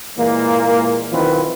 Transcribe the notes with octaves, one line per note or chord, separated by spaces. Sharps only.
A#2 E3 G#3 A#3
B1 D#3 E3 C4 F4 B4